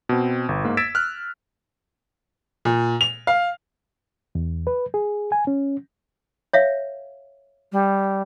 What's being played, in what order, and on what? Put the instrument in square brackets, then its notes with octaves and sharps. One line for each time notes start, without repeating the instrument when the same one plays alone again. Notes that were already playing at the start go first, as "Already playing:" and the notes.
[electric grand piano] B2 C4
G1
G#2 A#3
E6 G#6 A6 B6 D7 E7
F6 F#6
[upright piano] A#2
F7
F5
[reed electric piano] E2
B4
G#4
G#5
C#4
[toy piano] C#5 E5 F5
[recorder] G3